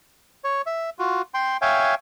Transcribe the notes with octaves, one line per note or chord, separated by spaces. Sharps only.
C#5
E5
F4 F#4
G5 C6
C#5 E5 F5 G5 G#5